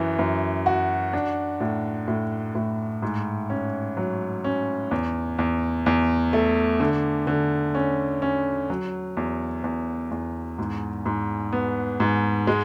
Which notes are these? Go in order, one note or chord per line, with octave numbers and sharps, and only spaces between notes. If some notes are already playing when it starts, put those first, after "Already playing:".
Already playing: F#2 E3
F#2
F#4
D4
A2
A2
A2
G#2
C#4
F#3
C#4
E2
E2
E2
A3
D3
D3
C#4
C#4
F#3
E2
E2
E2
G#2
G#2
B3
G#2
G#3